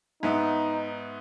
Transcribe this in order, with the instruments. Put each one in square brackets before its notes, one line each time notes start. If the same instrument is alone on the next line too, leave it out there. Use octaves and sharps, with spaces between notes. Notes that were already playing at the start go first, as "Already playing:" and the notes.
[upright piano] G#2 B3 E5 [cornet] D#4